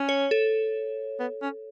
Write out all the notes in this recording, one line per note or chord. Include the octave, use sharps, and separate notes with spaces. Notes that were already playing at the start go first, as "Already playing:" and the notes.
Already playing: C#4
C#5
A4
B3
C#4